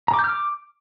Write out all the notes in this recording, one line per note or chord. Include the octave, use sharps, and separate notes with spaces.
A#5
D6
G6
F6
D6